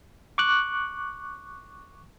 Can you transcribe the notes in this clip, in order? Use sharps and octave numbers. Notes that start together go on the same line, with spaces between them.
C#6 D6 F#6